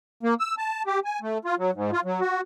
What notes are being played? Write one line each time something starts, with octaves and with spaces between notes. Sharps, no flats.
A#3
E6
A5
G4
G#5
A3
F4
F#3
G#2
F4
F#3
F#4